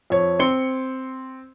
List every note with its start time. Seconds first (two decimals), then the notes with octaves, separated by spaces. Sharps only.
0.10 F2 C#5
0.39 C4 C6 C#7 G7